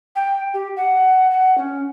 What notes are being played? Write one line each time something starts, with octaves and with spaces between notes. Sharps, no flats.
G5
G4
F#5
F#5
C#4